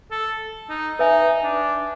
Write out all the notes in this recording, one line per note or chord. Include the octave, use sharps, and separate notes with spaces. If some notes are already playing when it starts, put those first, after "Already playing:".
A4
D#4
D#4 B4 E5 G#5
D4